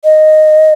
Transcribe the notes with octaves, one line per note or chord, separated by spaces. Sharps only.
D#5